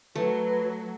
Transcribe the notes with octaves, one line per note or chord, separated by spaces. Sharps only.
F#3 A3 B4